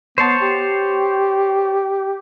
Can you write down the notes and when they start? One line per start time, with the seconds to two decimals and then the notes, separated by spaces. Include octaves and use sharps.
0.18 B3 C5 C#5 A5
0.42 G4